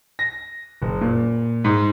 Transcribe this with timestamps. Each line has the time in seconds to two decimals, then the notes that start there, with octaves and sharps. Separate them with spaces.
0.19 A#6
0.82 F#1
1.01 A#2
1.64 G#2